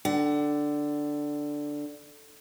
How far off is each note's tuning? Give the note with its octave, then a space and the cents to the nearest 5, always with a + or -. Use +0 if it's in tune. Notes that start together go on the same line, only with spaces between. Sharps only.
D3 +0 F#5 +30